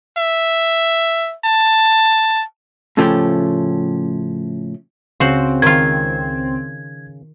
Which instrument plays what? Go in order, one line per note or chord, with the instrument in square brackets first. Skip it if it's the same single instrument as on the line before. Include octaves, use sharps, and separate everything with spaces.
[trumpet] E5
A5
[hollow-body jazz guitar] A2 C#3 F3 A3 C#4 G4
[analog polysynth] C#2 C4 [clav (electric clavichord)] C#3 [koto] F#4 C5
[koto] D#3 F4 [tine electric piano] G#6